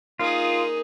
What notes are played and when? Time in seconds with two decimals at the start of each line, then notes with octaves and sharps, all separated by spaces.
0.19 A#3 D#4 F4 G#4 D5